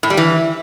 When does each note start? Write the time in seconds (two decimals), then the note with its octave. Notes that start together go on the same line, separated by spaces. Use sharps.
0.03 A2
0.10 G3
0.17 E3